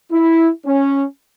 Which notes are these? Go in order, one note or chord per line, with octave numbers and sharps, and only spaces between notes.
E4
C#4